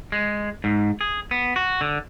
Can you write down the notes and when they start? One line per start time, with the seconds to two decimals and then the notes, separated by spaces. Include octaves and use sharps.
0.12 G#3
0.64 G#2
1.01 G#4
1.31 B3
1.56 F#4
1.81 D3